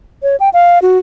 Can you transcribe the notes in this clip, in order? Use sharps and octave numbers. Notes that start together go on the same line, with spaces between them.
C#5
G5
F5
F#4